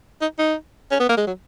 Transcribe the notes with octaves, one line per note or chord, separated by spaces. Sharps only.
D#4
D#4
C#4
B3
A#3
G#3
F#3